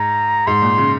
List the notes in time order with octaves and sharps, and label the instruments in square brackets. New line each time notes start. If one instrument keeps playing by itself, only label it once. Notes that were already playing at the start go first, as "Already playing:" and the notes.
Already playing: [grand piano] G#2 [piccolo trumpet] A#5
[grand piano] G#2 [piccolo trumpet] C6
[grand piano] A#2
C#3